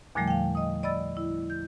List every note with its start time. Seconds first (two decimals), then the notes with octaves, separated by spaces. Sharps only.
0.15 E2 A#2 D3 F3 G3 A3
0.28 F5 G5
0.55 D#5 D#6
0.83 D5 D#5 B5 E6 A6
1.17 E4
1.50 G6